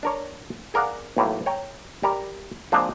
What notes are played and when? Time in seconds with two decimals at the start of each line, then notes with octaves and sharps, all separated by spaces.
0.03 D4 A#4 C#5
0.74 G#4 A#4 D5 F5 F#5
1.16 B1 A2 A#3
1.46 C#5 G5 A#5
2.03 G3 A#4 A#5
2.72 F3 G#3 A#3 C4 D4